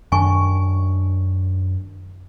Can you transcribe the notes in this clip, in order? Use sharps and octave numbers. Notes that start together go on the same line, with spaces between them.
F#2 D#3 D4 G#5 C#6